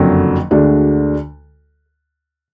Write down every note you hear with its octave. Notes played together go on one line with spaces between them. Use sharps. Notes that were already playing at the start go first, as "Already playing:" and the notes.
Already playing: F#1 F2 D3 F#3
D2 D3 G#3 D4 F#4